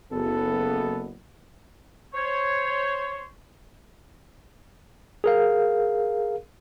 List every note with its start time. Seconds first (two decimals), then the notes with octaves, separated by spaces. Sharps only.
0.12 F#1 B3 A4
2.14 C5 C#5
5.24 G#4 A#4 F5